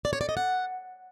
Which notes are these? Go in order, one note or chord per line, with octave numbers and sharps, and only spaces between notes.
D5
C#5
D5
D#5
F#5